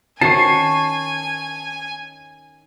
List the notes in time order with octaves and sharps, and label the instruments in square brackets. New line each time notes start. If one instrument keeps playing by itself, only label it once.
[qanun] D#3 C#4 F#4 [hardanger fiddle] G#5 [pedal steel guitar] A5 C#6 [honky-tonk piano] C7